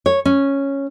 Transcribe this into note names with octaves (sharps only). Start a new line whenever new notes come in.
C#5
C#4